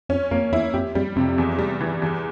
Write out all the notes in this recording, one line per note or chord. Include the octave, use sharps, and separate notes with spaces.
F2 C#4
F2 A#3
E2 E4
F2 G4
F2 G3
F2 C3
E2
G3
E3
E2